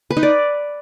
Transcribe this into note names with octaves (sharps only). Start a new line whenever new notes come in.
B4
D#4
D5